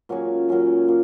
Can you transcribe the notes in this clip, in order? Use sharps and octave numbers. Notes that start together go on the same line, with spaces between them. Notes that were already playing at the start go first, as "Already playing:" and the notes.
A#2 F#3 C#4 G#4
A#2 F#3 C#4 G#4
A#2